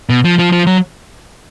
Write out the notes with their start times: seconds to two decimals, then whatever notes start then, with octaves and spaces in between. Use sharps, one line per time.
0.09 B2
0.24 F3
0.39 F3
0.52 F3
0.67 F#3